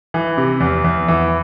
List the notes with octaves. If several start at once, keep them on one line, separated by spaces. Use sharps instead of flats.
E3
C3
E2
E2
E3